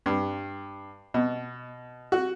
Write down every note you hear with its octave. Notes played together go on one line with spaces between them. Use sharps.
G2
B2
F#4